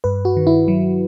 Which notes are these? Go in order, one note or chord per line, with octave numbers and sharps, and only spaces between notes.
G2 B4
F#4
D#3
E4
F#3